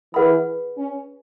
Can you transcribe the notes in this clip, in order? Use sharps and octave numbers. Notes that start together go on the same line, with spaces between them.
E3 G#4 B4 F#5 B5
C#4